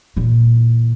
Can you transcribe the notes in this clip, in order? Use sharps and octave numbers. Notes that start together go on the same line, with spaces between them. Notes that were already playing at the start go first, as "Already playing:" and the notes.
A#2 E3